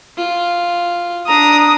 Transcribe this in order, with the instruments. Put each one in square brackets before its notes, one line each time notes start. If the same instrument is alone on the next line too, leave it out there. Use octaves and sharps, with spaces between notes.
[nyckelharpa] F4
[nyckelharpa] D4 A#5 [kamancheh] D#6